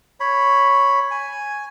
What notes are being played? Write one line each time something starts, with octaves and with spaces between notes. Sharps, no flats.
C#5 B5
G#5